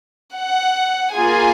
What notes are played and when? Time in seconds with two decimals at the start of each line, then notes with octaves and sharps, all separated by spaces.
0.36 F#5
1.15 A#3 F4 G#4 G#5